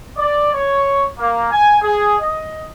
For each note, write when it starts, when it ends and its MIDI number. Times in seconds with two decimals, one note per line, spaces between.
0.17 0.51 74
0.53 1.04 73
1.18 1.48 58
1.52 1.77 80
1.83 2.16 68
2.21 2.67 75